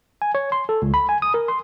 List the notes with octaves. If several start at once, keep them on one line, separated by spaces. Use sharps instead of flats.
G#5
C#5
C6
A4
C#2
B5
G#5
D#6
A#4
C6